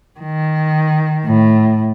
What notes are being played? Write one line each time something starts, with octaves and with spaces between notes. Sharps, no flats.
D#3
A2